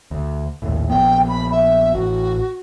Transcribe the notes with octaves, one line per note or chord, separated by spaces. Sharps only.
D2
A#1 D#2 A2
A#1 F3 B3 G5
B5
E5
A1 F#4